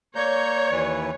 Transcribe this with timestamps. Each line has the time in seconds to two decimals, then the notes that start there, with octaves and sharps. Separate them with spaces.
0.16 A#3 C#5 D5 A#5 G6
0.71 D#2 E3 B4